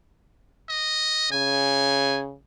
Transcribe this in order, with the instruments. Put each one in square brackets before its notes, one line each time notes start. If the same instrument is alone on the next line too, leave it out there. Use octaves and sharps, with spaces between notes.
[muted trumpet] D#5
[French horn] C#3 [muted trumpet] G#5